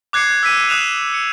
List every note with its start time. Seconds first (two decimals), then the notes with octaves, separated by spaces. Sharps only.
0.13 D6 F#6 G#6 C7 C#7
0.43 E6 B6 D#7
0.69 D#6 F#6 E7 F7
1.14 C#7